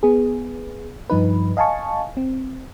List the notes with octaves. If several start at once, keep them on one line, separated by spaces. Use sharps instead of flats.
B3 G#4
G2 F3 D#4 B4
D#5 F5 G#5 A5 C#6
C4